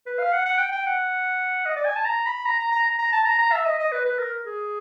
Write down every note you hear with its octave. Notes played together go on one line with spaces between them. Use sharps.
B4
F5
F#5
F#5
G5
G5
F#5
D#5
D5
G#5
A5
A#5
B5
A#5
A#5
A#5
A#5
A#5
A5
A#5
A#5
E5
D#5
D#5
B4
B4
A#4
G#4